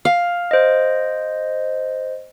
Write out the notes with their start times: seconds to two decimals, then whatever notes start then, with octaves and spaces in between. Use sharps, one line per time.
0.05 F5
0.51 C5 D#5